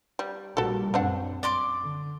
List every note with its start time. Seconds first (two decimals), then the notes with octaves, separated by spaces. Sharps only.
0.19 G3
0.57 A#1 A#2 G3 F#4 A4
0.94 F#2 C4 D4 F#5
1.43 D5 C6 D6
1.82 D3